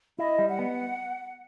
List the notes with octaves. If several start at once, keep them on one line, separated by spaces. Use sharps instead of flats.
E4 D#5
G3
F#5
B3